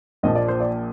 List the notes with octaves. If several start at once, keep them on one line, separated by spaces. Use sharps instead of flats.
A#1 A#2 F3 D#5
D5
C5
D5